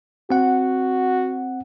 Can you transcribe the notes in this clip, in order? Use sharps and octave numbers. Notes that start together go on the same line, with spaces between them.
C4 F#4 F#5